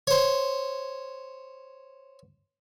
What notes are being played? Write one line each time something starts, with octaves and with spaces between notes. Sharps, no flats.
C5 C#5